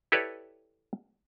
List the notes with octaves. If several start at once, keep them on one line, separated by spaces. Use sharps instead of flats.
E4 G4 A4 B4 C#5 D5